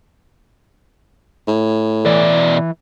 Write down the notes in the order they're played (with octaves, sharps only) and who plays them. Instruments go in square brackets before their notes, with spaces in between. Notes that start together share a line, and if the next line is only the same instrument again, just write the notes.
[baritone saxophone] A2
[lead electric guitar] B2 D5 [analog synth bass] E3